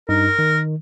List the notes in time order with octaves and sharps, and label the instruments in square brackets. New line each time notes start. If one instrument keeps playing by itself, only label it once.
[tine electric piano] G2 D#4 [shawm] A#4
[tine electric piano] D#3